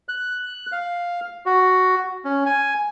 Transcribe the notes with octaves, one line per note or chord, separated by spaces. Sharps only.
F#6
F5
F#4
C#4
G#5